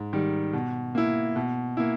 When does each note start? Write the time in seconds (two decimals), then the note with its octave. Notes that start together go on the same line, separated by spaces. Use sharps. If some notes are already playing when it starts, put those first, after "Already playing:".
Already playing: G#2
0.13 D#3 G3
0.53 B2
0.95 A#3 E4
1.36 B2
1.77 A#3 E4